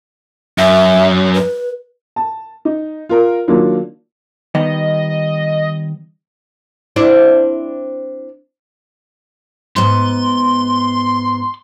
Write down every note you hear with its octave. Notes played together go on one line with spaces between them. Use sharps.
F#2 E5
B4
A5
D#4
F4 A#4
D#3 F#3 A#3 D4 F4
D#3 G3 B3 D#5
C4 D4 E4
G#2 B3 C6